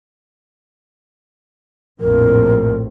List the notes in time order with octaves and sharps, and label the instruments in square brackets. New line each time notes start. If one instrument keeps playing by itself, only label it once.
[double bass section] A#1 F2 A2 [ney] A#4